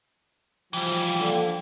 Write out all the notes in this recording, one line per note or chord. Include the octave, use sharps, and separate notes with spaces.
E3 F3 G3 G5
D3 A#3